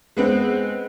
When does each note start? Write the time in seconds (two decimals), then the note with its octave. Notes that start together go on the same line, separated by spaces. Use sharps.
0.17 G#3 B3 C4